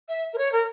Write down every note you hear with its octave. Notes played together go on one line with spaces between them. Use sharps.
E5
A#4
C#5
A#4